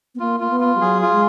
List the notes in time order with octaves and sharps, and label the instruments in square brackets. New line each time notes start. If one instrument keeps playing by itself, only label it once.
[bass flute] B3
[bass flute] A#3 [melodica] F4
[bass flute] A#3 [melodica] F4
[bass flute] B3
[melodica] F4
[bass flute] G3
[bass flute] F#3 [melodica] G#4
[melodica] F4
[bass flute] G#3